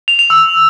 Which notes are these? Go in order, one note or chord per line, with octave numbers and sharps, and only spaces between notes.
F7
F7
E6